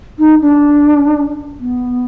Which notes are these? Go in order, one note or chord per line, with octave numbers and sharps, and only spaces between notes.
D#4
D4
B3